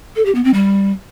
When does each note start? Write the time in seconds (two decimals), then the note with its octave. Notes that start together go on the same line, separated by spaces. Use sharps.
0.16 A4
0.25 G4
0.35 B3
0.44 C4
0.54 G3